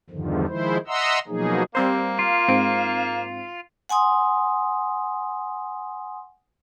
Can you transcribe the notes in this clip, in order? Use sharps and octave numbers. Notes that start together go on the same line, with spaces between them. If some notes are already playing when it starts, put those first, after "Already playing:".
E2 G2 D3 D#3 F3
D#3 F3 G#3 E4 C5
D#5 E5 F#5 A#5 C6 E6
B2 F3 F#3 A#3 D#4 G#4
G3 A#3 C4 C5
F4
G#2 C4 D7
F#5 G#5 C6 D#6